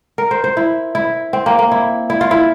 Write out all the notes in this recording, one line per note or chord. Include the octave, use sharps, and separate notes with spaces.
A#4
C5
C5
E4
E4
C4
A#3
A#3
E4
E4
F4
E4